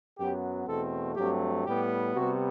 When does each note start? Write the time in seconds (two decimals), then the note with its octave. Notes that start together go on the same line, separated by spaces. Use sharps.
0.17 F#2 F#3 B3 G4
0.67 E2 B2 A3 C4 A4
1.16 G2 F#3 A3 C4 G4
1.65 A2 G3 B3 G4
2.15 C3 G3 B3 F#4